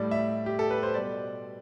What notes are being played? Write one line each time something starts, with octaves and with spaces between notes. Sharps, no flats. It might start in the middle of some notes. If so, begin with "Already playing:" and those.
Already playing: A2 G3 D5
E5
G4
A4
B4
C5
B2 G3 D5